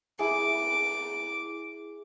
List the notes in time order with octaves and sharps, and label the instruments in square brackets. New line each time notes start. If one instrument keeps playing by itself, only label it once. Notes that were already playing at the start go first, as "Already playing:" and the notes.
[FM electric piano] E4 G#4 [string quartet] D6